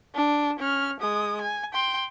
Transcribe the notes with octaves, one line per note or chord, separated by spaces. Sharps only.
D4
C#4 F6
G#3 D#6
G#5
G5 C6